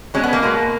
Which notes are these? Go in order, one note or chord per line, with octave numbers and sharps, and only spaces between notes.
B2 G#3 C#4
B3
A#3
B2 G#3